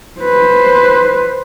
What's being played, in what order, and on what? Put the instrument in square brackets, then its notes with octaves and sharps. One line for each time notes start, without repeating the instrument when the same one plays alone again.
[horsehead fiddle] B4 C5